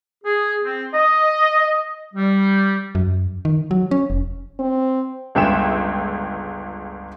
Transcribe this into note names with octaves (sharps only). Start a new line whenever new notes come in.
G#4
C4
D#5
G3
F#2
D#3
F#3
C#4
F1
C4
G1 C#2 E5 G5 E7